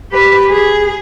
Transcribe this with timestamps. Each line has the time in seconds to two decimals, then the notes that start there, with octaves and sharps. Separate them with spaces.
0.11 G4 B4
0.50 G#4